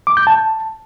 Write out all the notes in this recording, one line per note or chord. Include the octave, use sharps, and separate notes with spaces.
D6
G6
A5